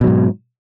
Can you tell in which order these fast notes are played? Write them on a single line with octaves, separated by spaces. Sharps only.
B2 F#3 G#2